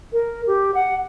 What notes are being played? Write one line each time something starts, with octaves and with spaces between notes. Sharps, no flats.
A#4
G4
F#5